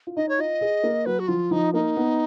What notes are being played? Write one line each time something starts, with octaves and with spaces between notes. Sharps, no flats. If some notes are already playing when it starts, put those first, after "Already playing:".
F4
D#4 D#5
C#5
F4 D#5
G#4
A#3
F#3 B4
F#4
F3 F4
F3 D#4
A#3 D#4
B3